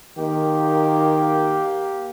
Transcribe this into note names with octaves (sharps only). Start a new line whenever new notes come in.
D#3 A#3 G4